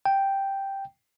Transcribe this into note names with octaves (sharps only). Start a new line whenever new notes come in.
G5